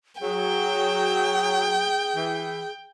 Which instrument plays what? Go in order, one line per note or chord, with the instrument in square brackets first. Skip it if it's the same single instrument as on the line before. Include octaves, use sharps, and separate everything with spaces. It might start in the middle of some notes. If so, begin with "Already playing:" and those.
[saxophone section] F#3 [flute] G#4 [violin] G5
[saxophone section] E3